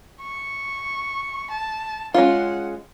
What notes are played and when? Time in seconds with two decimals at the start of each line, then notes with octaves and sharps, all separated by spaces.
0.22 C#6
1.50 A5
2.14 G#3 C#4 F4 F#5